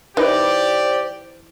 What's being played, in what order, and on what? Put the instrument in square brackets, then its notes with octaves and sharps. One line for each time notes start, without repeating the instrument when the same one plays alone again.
[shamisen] E3 D#4 B4 [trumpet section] G4 D5 [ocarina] C5